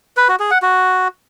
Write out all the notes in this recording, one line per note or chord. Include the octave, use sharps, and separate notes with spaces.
B4
F#4
G#4
F#5
F#4